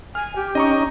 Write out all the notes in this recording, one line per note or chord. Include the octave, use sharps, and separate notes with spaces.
G#5 F6
G4
C#4 D#4 D#5 A#5 C#6